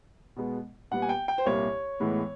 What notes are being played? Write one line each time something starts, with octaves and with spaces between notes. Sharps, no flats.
B2 G#3 B3
A#2 G3 B3 F#5
G#5
G5
G5
C5
C2 A#2 G3 A#3 C#5
A2 E3 G#3 B3